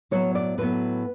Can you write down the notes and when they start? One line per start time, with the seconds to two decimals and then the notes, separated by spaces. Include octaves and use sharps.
0.11 A2 F#3 B3 C#5
0.35 D5
0.58 A2 F#3 B3 B4